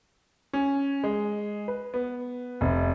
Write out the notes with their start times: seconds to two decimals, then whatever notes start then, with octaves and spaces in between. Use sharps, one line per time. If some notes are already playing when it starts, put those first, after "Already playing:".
0.53 C#4
1.04 G#3
1.68 B4
1.94 B3
2.61 F1